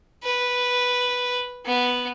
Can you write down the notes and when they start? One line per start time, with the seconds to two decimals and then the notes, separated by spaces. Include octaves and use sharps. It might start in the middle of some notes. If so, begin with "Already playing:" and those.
0.23 B4
1.65 B3